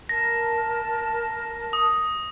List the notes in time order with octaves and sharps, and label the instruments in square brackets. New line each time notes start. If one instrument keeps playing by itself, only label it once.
[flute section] A#4 A5 [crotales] A#6
[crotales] D#6